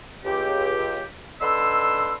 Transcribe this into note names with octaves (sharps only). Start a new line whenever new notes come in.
C#2 G4
D3 D#4 B4 C6 E6